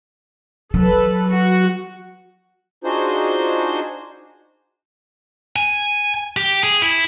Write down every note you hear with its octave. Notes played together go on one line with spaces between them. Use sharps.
F#3 A4 B4
F#4
D4 D#4 F4 F#4 G#4 C5
G#5
G4
G#4
E4